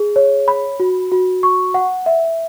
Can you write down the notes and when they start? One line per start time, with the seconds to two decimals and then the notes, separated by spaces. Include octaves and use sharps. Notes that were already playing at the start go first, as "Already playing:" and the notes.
Already playing: G#4
0.16 C#5
0.48 B5
0.80 F#4
1.12 F#4
1.43 C#6
1.74 F#5
2.06 E5